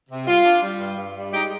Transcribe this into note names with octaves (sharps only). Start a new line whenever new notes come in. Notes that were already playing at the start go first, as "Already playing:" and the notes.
C3
G3 F4
D4
G3
G2
G2
G3
G#3 D#4 G4